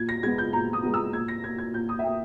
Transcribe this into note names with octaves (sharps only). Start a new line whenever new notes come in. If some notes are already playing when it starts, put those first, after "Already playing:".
Already playing: A#2 G#6
A#6
G#3 B3 G#6
G6
A#2 A#5
D#6
G#3 B3
E6
A#2 G#6
A#6
A#3 G#6
G#6
A#2 G6
D#6
E5
A#3 G5